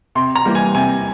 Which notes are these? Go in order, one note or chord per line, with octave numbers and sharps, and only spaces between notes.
C3 C6
A#5
E3 G3 A#3
G#5
C3 G#5